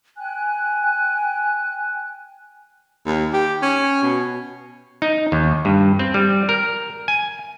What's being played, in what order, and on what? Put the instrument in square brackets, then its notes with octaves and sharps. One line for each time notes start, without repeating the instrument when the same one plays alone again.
[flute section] G5 G#5 F#6
[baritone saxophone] D#2
G4
C#4
B2
[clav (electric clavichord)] D#4
D#2
G2
C4
G3
A#4
G#5